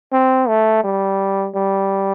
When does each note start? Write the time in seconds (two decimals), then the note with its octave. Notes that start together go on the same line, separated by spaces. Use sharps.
0.13 C4
0.48 A3
0.84 G3
1.56 G3